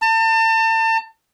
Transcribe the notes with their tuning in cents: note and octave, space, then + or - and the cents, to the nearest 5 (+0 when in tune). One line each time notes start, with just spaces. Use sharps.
A5 +35